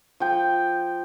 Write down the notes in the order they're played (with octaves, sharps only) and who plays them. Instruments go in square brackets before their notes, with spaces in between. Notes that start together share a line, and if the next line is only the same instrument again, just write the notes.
[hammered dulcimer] F3 G5